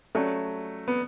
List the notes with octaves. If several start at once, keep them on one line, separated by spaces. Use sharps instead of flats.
F#3 A3 C#4 G4 D5 A5
B3